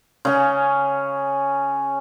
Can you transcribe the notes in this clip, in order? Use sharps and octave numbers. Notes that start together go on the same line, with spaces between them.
C#3 C#4